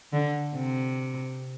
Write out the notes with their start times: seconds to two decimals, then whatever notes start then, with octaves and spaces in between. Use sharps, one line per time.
0.13 D3
0.55 C3